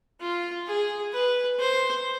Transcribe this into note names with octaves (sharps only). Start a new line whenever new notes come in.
F4
G#4
B4
C5